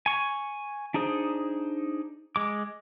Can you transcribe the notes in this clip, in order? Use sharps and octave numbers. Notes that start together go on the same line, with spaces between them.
G#5 C#6
D4 D#4 G#4 C5
G#3 D6